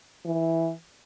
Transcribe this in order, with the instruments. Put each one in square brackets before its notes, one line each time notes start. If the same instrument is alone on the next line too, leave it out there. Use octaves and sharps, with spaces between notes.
[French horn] E3